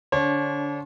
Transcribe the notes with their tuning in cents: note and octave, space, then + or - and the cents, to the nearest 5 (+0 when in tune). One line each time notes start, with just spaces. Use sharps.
D3 -15 D4 -35 C#5 -40